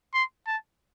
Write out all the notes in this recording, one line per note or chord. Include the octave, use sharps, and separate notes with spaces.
C6
A5